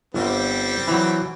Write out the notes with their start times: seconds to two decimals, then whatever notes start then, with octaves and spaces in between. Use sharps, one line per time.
0.14 G1 G3 C4
0.88 E3 F#3